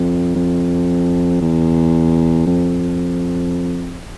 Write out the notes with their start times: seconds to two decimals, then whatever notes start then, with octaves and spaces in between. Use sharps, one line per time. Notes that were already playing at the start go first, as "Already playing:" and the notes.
Already playing: F2
0.36 F2
1.41 E2
2.47 F2